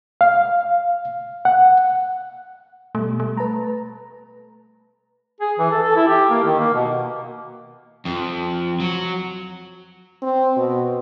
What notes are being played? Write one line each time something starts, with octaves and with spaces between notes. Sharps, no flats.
F5
F#5
B2 G3 A3
A3
B4 A5 A#5
G#4
E3
A4
A4
E4
G4
A#3
D#3
A#3
B2
F2
F#3
C4
B2